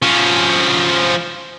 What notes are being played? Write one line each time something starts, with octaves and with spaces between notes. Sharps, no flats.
F3 C#4